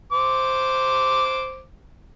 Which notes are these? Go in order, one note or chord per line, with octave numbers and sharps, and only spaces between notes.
C5 D6